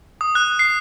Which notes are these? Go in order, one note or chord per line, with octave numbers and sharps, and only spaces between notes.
D#6
F#6
C7